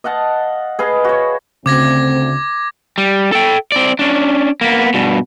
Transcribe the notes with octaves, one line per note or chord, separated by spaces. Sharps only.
D#5 F5 F#5 A5
G#4 B4 D#5 F5
F#4 C#5
D2 C#3 C4 D6 G#6 A#6
G3
A4 G5
C4 D5
C#4 D4
A#3 B3
G2 B2